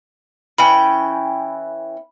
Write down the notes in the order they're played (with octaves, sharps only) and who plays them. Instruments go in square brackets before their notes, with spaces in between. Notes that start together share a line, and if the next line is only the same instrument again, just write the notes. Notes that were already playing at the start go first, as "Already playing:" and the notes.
[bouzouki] E3 C#4 G5 [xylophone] B5